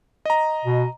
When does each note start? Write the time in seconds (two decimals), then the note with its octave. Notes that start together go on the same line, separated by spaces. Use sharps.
0.25 D#5 A#5
0.65 B2